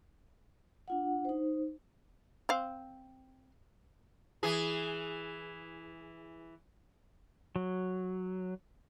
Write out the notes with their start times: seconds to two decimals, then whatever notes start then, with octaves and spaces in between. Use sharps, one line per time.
0.88 D4 F4 F#5
1.25 D#4 C5
2.49 C4 F5
4.43 E3 G#4
7.56 F#3